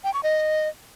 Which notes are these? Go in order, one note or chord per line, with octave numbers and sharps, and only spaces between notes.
G5
C#6
D#5